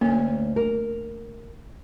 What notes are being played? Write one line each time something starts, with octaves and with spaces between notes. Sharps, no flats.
D2 A#3 C#4
A#4